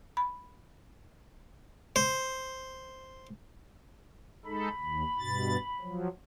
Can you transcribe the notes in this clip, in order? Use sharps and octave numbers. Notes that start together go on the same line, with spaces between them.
B5
C5
G#3 D#4 A4 B5
D#2
G2 B2 A6
F3 F#3